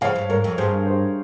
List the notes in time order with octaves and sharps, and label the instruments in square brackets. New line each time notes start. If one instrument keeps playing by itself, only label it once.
[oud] C#3 F3 [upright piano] C#5 F5
[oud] G2
[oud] G#2 [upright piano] A#4 C#5
[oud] F2
[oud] G2 [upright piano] G#4 C5
[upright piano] G#4 C5